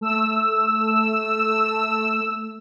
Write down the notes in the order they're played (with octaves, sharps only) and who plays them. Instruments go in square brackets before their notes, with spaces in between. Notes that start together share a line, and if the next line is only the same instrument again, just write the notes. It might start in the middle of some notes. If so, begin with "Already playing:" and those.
[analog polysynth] A3 E6